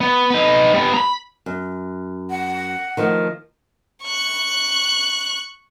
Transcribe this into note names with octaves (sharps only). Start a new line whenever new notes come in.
B3
D#4 B4
G3 B3
A#5 B5
F#2
F#5
D#3 F3 A3
C#6 F#6